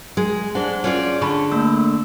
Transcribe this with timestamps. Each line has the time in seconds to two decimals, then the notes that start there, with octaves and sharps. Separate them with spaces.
0.17 G#3
0.55 D4 G#4 C5 F#5
0.84 C#4 F4 G#4 C#5 D5
1.22 D3 A5 B5 C#6
1.52 A3 A#3 E6